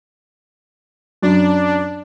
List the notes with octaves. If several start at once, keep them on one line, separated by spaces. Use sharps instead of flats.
F#2 D4